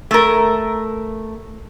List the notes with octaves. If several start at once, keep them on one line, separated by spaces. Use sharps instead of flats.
A3 A#4